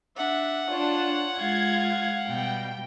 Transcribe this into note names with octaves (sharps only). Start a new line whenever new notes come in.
D4 E5 F#5
D4 F4 C#5
G#3 F4 F5 G#6
B2 G3 G5